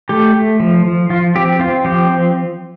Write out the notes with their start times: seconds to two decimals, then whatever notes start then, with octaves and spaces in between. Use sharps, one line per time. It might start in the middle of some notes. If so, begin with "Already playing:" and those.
0.09 A3 G4
0.35 A3
0.60 F3
0.85 F3
1.09 F3 F4
1.35 C4 G4
1.59 C4 F4
1.84 F3 G4
2.10 C4